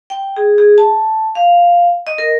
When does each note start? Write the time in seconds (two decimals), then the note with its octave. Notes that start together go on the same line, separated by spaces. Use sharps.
0.10 G5
0.37 G#4
0.58 G#4
0.78 A5
1.35 F5
2.07 D#5
2.18 A#4